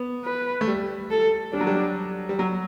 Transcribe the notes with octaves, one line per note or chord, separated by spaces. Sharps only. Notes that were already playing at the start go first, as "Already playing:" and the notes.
Already playing: B3
B4
A3
G3
A4
G3 D4
F#3
G3
G3
F#3